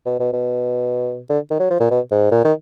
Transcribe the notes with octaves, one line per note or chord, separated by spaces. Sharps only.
B2
B2
B2
D3
D#3
F#3
F3
A#2
B2
G#2
A#2
D#3